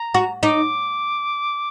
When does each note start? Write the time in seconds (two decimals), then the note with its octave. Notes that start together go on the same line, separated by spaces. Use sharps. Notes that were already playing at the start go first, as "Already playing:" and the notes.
Already playing: A#5
0.14 F#4
0.43 D#4 D6